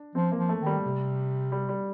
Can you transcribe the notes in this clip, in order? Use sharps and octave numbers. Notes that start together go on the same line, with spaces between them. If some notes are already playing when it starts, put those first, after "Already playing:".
Already playing: D4
F3 C4
A#3
F3
A3
D#3
G3
C3
G3
G3